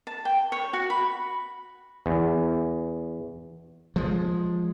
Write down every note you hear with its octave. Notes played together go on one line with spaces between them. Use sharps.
A5
G5
C#5
F#4
B5
E2
F3 G#3